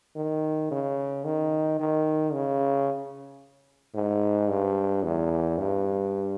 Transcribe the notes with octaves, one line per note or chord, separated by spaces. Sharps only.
D#3
C#3
D#3
D#3
C#3
G#2
G2
E2
G2